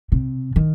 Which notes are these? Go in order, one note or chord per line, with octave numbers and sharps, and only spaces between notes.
C3
D#3